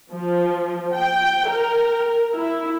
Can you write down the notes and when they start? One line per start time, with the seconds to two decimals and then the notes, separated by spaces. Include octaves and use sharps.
0.13 F3
0.95 G5
1.50 A#4
2.35 E4